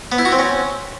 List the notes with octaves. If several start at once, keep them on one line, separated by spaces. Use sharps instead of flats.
B3
E4
F#4
C4
C#4